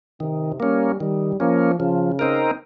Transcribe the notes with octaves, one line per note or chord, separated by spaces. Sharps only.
C3 D#3
G3 A#3 C#4
D#3 G3
F3 A#3 C#4
C#3 F3
C4 D#4 A#4